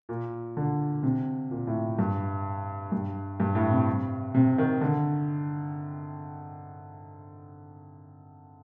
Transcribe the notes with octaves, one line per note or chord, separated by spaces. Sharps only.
A#2
D3
C3
A#2
A2
G2
G2
G2
A2
C3
C3
D#3
D3